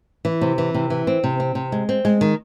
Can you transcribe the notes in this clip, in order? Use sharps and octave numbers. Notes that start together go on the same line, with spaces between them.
E3
C3
E3
C3
E3
C4
C3
C4
C3
G#3
C4
G#3
D#3